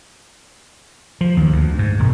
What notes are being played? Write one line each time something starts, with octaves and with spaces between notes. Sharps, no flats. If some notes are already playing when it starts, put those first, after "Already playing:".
F3
D#2
D2
G#2
E1